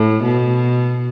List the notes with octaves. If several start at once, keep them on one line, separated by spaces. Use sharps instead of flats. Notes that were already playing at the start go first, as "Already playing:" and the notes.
Already playing: A2
B2